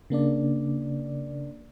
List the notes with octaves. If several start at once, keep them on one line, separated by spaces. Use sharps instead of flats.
C#3 A#3 D4 D5